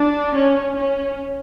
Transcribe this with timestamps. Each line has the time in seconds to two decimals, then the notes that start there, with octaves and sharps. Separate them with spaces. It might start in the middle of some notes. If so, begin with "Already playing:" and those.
Already playing: D4
0.34 C#4
0.77 C#4